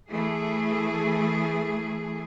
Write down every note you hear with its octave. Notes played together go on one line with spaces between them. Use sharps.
E3 A3 G#4